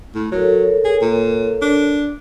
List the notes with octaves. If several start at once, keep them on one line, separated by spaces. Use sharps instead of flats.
A2
F#3 A4 A#4 C#5
G#4
A#2
D4